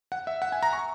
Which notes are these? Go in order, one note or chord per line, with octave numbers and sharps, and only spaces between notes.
F#5
E5
F#5
G#5
A#5
C#6